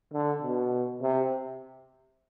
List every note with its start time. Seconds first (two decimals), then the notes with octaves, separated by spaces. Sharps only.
0.13 D3
0.42 B2
1.01 C3